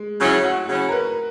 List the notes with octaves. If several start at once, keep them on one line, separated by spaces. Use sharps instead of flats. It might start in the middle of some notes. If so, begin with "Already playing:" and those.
Already playing: G#3
C#3 F#3 C#4 E4
F#4
C#3 F#3 C#4 E4 F#4
A#4
B4